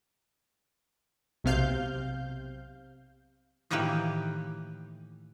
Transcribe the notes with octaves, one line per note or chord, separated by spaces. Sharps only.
B1 C3 F5 G6
A2 D#3 E3 A#3 G4 B4